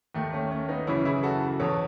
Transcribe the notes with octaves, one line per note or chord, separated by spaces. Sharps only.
D#2 D#3 A3
A3 C#4
A3 C#4
B3 D#4
F#2 C#3 E3 C#4 E4
E4 G#4
F#4 A4
E2 B2 A4 C#5